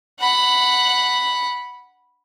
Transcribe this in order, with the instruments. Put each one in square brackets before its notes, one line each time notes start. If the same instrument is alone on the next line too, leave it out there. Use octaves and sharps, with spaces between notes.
[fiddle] F#5 B5